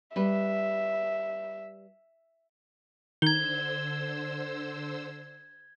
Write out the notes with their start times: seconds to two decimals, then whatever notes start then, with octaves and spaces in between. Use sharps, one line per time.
0.16 G3 B4 E5
3.22 D3 D#3 C5 E6 G#6 G7